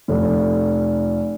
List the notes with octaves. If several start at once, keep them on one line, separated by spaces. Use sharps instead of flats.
F1